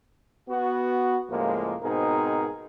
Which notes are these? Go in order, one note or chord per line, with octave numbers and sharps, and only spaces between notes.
B3 F#4
C#2 A2 F3 G#3 A#3
G#2 B2 C4 D#4 G#4 A#4